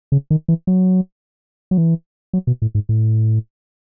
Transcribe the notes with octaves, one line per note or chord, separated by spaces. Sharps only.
C#3
D#3
E3
F#3
F#3
E3
F#3
B2
A2
G#2
A2